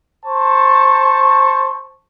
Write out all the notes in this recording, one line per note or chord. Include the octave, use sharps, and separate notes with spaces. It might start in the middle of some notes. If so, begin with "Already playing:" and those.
C5 A5 C#6